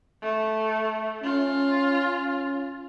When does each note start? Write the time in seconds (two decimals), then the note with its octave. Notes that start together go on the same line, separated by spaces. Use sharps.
0.22 A3
1.23 C#4 F4